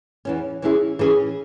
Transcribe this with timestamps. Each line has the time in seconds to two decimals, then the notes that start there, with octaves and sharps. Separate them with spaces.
0.25 E2 E3 C#4
0.62 E3 C#4 E4 G#4
0.99 E3 C#4 G#4